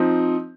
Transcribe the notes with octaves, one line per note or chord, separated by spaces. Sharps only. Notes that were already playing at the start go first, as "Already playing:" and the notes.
Already playing: F3 C4 D#4